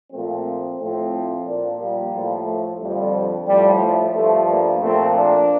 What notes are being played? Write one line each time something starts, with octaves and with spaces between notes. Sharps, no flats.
A#2 F3 A3 C4
A2 F3 A3 C4
A#2 F3 A#3 D4
G3 A#3
A2 F3
A3
F2 D3 F3 G3
A2 F3 G3
A3
G2 F3 A3
G3 A#3
A#2 F3 A3 C4
A#3 D4